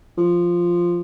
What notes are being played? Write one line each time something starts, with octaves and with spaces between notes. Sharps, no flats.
F3